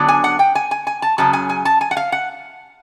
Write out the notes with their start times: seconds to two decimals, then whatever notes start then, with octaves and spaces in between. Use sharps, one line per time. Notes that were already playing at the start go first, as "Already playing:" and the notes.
Already playing: D3 F#3 B3 D4
0.08 G#5
0.24 F#5
0.39 G5
0.55 G#5
0.71 G#5
0.87 G#5
1.02 A5
1.18 F#2 C#3 F#3 A5
1.33 G#5
1.49 G#5
1.65 A5
1.81 G#5
1.91 F#5
1.97 F5
2.12 F#5